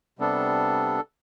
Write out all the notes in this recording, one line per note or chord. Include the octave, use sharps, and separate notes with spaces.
C3 G3 B3 D4 A4